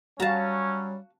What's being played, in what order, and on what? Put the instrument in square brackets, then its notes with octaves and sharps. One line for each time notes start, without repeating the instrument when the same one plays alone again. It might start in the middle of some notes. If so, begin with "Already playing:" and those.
[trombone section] F#3 C#4 [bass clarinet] G3 [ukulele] F#4 F5 [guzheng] A5 A#5